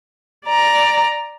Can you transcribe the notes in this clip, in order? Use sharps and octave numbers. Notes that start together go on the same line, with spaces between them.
D5 A#5